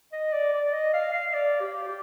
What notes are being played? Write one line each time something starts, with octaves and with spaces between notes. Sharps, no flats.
D#5
D5
D5
D#5
F5
F5
D5
G4
G4